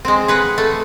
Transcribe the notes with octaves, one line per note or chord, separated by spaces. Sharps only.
G#3 C4
G#4 B4 F#5
A3